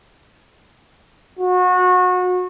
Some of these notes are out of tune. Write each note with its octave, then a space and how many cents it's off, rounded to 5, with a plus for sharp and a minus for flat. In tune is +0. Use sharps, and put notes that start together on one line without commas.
F#4 -30